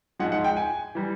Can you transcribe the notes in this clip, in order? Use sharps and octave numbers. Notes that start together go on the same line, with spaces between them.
G#2 F3 G#3 F#5
F#5
G5
G#5
E3 G3